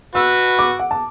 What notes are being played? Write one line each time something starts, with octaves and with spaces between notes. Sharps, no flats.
F#4 B4 E6
D6
F#5
A5